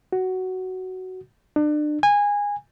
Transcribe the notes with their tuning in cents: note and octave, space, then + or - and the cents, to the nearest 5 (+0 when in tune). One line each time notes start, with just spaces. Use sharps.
F#4 +10
D4 +35
G#5 -20